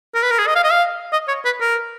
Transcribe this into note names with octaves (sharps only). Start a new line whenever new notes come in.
A#4
B4
A#4
G#4
D#5
F5
D#5
F5
D#5
C#5
B4
A#4